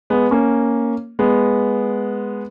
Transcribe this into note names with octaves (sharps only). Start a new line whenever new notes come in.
G#3 B3
A#3 C#4
G#3 B3